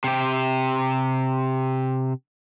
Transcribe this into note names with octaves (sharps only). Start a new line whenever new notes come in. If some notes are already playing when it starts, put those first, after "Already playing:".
C3 G4